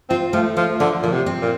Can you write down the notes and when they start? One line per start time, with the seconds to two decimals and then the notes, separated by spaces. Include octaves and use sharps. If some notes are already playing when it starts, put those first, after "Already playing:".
0.09 C4 F4
0.33 F3 A3
0.57 F3 F4
0.80 D3 F3
1.02 A#2 F3
1.12 C3
1.26 C4
1.42 A#2